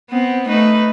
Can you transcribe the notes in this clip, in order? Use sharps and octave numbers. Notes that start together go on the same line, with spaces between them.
B3 C4
A3 D#4 B4